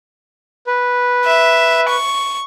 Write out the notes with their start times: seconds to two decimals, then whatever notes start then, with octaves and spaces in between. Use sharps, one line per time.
0.67 B4
1.26 E5
1.89 C#6